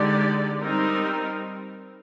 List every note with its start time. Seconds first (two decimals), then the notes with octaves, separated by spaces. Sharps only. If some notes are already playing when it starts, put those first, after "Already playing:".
Already playing: D3 G#3 D#4 G4 D5
0.61 G3 C4 D#4 A#4